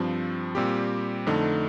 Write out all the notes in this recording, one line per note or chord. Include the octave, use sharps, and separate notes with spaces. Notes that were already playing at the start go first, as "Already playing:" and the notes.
Already playing: G2 F3 C4
A#2 G3 C4 G4
F2 D3 A3 D#4